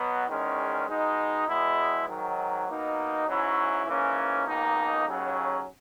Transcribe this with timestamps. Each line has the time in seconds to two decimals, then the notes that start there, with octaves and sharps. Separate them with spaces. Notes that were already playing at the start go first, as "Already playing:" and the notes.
Already playing: B2 F#3 B3
0.28 E2 D#3 G#3 C#4
0.87 B2 G#3 D#4
1.47 E2 B2 G#3 B3 E4
2.07 G#2 D#3 F#3
2.68 B2 A#3 D#4
3.26 G#2 F#3 C#4 E4
3.86 G#2 E3 A#3 C#4
4.46 C#2 B2 A#3 D#4
5.06 D#2 C#3 F#3 C#4